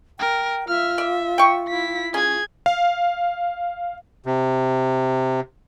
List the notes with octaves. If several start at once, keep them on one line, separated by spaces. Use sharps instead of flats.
A#4 G5
F4 E5 F6
D5 E5
G5 C#6
E4 B6
C#4 G#4 G#6
F5
C3